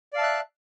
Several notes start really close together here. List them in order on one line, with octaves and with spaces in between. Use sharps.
D5 F5 A5 E5 F#6